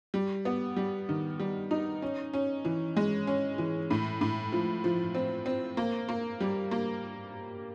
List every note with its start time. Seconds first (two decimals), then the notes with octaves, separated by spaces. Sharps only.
0.14 G3
0.45 B3
0.76 G3
1.09 D#3
1.39 G3
1.71 D#4
2.02 C#4
2.33 C#4
2.65 E3
2.97 G#3
3.27 C#4
3.58 E3
3.90 A2
4.21 A2
4.52 F3
4.84 F3
5.15 C4
5.46 C4
5.77 A#3
6.09 A#3
6.40 G3
6.71 A#3